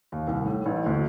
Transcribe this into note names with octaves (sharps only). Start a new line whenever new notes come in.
D#2
C2
A2
A1
D2